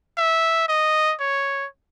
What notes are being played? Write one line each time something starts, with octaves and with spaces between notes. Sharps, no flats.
E5
D#5
C#5